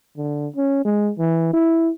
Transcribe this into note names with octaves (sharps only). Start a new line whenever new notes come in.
D3
C#4
G#3
E3
E4